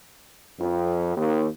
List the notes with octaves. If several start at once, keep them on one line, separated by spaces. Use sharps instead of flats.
F2
D#2